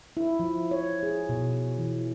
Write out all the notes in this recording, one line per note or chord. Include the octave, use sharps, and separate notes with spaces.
E4
F3
C#5
G#4
B2
E3